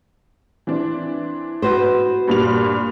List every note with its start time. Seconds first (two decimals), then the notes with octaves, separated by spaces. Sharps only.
0.67 E3 C4 D4
1.62 F#4 B4 C5
2.28 G2 A#2 F7